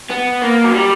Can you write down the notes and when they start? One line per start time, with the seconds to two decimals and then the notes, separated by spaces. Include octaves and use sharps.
0.10 B3
0.42 A#3
0.64 F#3
0.74 G3